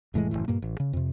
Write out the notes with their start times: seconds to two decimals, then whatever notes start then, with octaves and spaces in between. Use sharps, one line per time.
0.14 F1 A2 E3 G#3
0.31 F#1 C#2 A2 E3
0.48 G2 A#2 A#3
0.62 A1
0.80 C#3
0.93 F2 C3